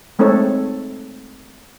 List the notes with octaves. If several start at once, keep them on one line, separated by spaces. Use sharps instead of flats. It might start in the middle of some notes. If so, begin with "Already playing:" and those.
G#3 A3 C4 D#4 A4 C#5